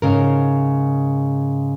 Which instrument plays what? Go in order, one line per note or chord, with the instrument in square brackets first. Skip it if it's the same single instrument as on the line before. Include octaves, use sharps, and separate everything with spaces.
[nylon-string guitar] G#2 C#3 A#4